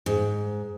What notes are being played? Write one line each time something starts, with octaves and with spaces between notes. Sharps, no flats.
G#2